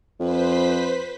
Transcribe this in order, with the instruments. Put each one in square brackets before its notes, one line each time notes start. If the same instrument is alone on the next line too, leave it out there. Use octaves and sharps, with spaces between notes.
[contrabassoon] F2 [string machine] B4 C5 B6